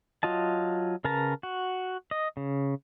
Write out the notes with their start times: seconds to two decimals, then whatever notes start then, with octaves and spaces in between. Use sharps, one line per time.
0.23 F#3 F4 D#5 A5
1.04 C#3 A#4 B4 A5 A#5
1.43 F#4
2.11 D#5
2.37 C#3